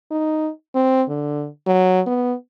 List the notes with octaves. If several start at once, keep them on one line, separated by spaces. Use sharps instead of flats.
D#4
C4
D3
F#3
B3